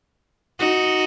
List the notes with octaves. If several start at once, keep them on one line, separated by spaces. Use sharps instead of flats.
D#4 F#4